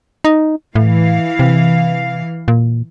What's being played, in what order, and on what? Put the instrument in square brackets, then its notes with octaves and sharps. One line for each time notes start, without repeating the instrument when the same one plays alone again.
[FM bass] D#4
[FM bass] A2 [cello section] E3 F5
[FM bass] C3
A#2